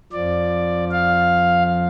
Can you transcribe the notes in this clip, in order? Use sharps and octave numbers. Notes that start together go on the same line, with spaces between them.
F2 F3 D5
F5